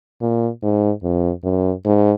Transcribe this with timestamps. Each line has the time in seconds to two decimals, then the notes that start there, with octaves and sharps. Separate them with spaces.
0.21 A#2
0.63 G#2
1.03 F2
1.44 F#2
1.85 G#2